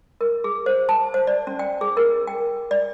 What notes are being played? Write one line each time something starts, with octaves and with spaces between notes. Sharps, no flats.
A#4
G#4
C5
A5
C5
D5
C#4
G5
G#4
A#4
G5
D5